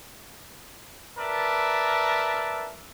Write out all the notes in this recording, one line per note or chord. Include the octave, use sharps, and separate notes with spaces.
A#4 B4 D5 E5 A5